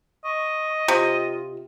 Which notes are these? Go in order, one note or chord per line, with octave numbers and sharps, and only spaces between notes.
D#5 C#6
C3 F4